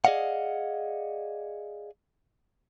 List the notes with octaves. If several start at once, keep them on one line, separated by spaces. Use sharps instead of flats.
G#4 D5 D#5 F5 F#5